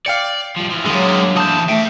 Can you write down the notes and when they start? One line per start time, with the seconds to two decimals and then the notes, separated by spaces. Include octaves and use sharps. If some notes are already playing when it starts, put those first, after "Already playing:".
0.06 D5 F5 G5 C#7
0.57 F3 G3
0.70 E3 F3
0.86 D3 F#3 G#3 A#3 G4
1.37 E2 A5 D#6 G6
1.69 A3 E5 G5